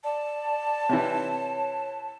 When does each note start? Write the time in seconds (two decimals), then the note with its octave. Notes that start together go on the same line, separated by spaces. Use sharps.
0.04 D5 A5
0.89 C3 E3 C#5